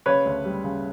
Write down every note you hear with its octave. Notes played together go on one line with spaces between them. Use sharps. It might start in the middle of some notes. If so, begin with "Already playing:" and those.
C#3 B4 C#5
D2
G3
C#3